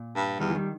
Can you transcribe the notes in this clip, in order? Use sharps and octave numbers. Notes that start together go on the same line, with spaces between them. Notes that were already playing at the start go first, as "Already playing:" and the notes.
Already playing: A#2
G2
E2 D#3 G3
E3
D#3 G3